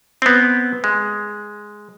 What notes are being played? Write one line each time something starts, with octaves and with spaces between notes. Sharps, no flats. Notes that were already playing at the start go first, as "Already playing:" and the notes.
B3 C4
G#3